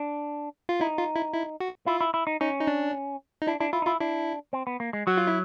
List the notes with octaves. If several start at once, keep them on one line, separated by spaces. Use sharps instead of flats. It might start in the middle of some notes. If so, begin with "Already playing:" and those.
Already playing: D4
F4
D#4 E4
F4
E4
E4
F#4
E4 F4
E4
E4
D#4
C#4 D#4
D#4
D4
D#4
D4 E4
D4 E4
E4 F4
D#4
E4 F4
D4 E4
C4
B3
A#3
G#3
F#3 F#4
F4
E4